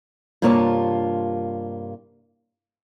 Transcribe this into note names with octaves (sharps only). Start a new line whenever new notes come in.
G2 C3 A#3 F4 C#5 A5